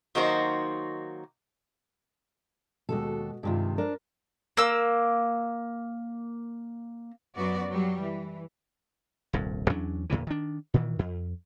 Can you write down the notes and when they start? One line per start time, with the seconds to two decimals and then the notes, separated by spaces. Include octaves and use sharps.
0.15 D#3 F#3 A#3 D#4 F#4 C5
2.89 D#2 B2 G#3 F#4 A4
3.43 G2 C3 D#3 G#3 F4
3.78 D4 A#4 C5
4.57 A#3 E6
7.36 F#2 F#3 B3 F#4 D5
7.69 F#3 G3
8.02 E3
9.33 D#1 C2 G2
9.70 E2 F#3 C#4 D4
10.10 E2 A#2 D3 E3
10.27 D#3 D4
10.74 A#2 D#3 E3
10.99 F2